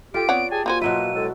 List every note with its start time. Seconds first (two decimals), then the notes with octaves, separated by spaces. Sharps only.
0.14 F4 G4 A4 D7
0.29 B3 C4 C#5 D5 F#5
0.50 G4 G#4 G#5 A5
0.66 G3 A#3 F4 F#4 C5 G#5
0.82 B2 F#3 E4 D#7
1.15 A2 G#3 A4